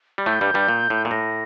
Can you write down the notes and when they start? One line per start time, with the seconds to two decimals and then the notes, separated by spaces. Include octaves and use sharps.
0.18 G3
0.26 A2 A3 G6
0.41 G2 G3
0.54 G2 G3
0.68 A#2
0.90 A2
1.05 A#2
1.11 A2 A#6